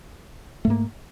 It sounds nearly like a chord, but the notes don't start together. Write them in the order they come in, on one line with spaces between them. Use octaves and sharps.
A3 G#2 A#3